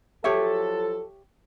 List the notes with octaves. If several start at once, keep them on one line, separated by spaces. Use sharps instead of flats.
F3 F#3 G4 A4 C#5 E5